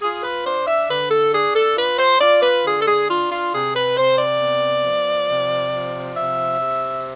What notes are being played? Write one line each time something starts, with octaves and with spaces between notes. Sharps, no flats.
F4 G#4
B4
D4 C5
E5
D3 B4
A4
D4 G#4
A4
F4 B4
C5
F4 D5
B4
D3 G#4
A4
G#4
D4 F4
F4
C3 G#4
B4
C3 C5
D5
B3
F3
C3
F3
C3 E5
C3